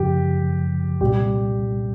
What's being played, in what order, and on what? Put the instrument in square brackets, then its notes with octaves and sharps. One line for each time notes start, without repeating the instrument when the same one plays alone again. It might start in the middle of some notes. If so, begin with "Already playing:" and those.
Already playing: [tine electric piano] F#2 C#3 F3 [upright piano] G4
[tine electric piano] C2 A#2 G3 [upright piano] G4